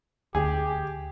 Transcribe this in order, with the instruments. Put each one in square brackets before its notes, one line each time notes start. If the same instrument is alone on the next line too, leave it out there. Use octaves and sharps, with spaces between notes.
[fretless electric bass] D2 [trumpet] G4 [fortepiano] G#4